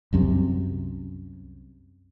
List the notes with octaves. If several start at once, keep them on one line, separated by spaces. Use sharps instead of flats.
C2 F#2 C3